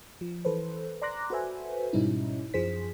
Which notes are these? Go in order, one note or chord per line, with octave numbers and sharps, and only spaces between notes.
F3
E3 A4 B4 C5
D5 A#5 C6 D6 F#6 A#6
F#4 A4 B4 C5 E5 G#5
G#2 B2 G3 C#4 D#4 E4
F#2 F3 G#4 C5 B6